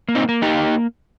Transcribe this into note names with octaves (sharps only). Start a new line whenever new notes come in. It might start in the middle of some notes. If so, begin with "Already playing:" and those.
A#3
C4 D#4
A#3
D#4 G4
A#3